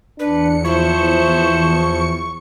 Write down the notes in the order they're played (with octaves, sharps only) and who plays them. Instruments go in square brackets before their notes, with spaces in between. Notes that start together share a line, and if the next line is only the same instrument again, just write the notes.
[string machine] E2 C#7 [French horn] D4 [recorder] B4
[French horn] F3 [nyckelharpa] E4 C5 [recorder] C#6